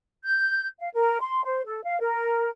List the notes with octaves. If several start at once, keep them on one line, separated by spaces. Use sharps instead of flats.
G6
F5
A#4
C6
C5
A4
F5
A#4